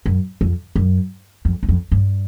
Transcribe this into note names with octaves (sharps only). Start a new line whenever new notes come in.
F#2
F2
F#2
F2
E2
F2
G2